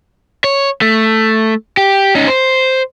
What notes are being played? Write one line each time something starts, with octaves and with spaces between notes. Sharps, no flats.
C#5
A3
G4
C#4 D#4
C5